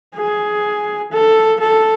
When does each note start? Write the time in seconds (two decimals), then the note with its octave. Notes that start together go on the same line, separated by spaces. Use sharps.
0.15 G#4
1.12 A4
1.60 A4